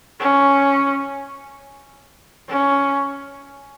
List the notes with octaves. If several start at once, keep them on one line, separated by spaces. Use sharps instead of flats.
C#4
C#4